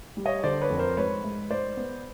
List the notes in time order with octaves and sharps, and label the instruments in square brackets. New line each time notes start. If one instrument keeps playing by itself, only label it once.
[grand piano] G3
C#5 D#5
D3 C5 D5
B4 C#5
F2
A#4 C5
G#2 B4 C#5
G#2
G#2 C5 D5
B3